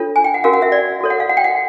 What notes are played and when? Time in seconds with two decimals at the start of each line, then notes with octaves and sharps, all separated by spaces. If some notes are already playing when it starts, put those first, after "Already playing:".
Already playing: D4 F4 A4 C#5
0.16 G#5
0.24 G5
0.34 F#5
0.44 C#4 F#4 A#4 F5
0.54 F#5
0.62 E5
0.72 D5
1.00 F#4 A4 C#5
1.10 F#5
1.20 F5
1.29 F#5
1.37 G5
1.44 F#5